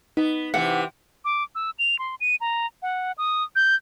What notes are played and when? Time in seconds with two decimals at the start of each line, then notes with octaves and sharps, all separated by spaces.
0.17 B3 D#4
0.54 C3 E3 F#5
1.25 D6
1.55 E6
1.79 F7
1.99 C6
2.21 D#7
2.41 A#5
2.82 F#5
3.18 D#6
3.56 G6